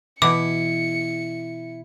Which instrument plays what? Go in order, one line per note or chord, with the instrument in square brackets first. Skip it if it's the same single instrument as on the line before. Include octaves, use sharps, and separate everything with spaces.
[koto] B2 E3 [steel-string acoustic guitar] E4 [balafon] D6 [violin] C#7